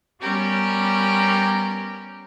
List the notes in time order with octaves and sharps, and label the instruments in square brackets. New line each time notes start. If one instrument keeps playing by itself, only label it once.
[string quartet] G3 B3 C#4 G4 A#4